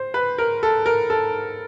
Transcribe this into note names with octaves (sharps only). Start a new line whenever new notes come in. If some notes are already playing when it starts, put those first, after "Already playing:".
Already playing: C5
B4
A#4
A4
A#4
A4